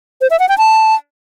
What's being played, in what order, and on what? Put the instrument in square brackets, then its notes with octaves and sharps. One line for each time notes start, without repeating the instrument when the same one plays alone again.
[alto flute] C5
E5
F#5
G5
A5